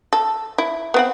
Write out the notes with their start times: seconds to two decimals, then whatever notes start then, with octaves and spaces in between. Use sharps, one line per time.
0.13 A4
0.58 E4
0.94 B3 C4 F#5